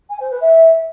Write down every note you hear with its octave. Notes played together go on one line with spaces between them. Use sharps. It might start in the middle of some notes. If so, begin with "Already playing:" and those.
G#5
C5
B4
E5